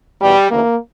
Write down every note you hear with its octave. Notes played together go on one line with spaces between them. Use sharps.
E2 B2 G3
D2 C#3 E3 A#3